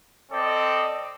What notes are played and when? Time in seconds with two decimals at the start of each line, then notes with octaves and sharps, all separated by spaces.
0.32 C4 A4 D5 D#5